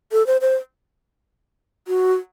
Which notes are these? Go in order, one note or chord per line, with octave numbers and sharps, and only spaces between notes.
A4
C5
C5
F#4